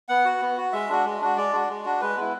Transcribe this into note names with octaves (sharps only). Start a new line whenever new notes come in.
B3 F#5
F#4
B3
F#4
G#3 E5
D4 F#4
G#3
D4 F#4
G#3 D5
D4 F#4
G#3
D4 F#4
G#3 B4
B3 E4